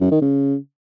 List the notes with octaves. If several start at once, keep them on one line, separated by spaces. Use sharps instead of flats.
F#2
D#3
C#3